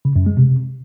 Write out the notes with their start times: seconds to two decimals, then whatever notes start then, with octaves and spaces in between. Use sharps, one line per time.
0.05 C#3
0.16 F#2
0.26 G#3
0.37 C3